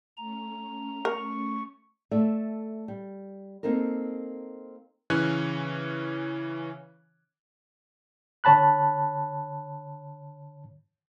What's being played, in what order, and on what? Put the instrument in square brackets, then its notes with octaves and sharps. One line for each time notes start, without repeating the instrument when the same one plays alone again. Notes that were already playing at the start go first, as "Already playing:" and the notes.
[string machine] A3 C#4 [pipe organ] A#5
[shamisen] A#4 [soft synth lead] C#6
[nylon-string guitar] A3 A4 D5 E5
G3
A#3 C4 D#4 A4 A#4
[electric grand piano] C#3 E3 C#4 C#5 G#5 F#6
[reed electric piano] D3 C#5 A5 B5 F#6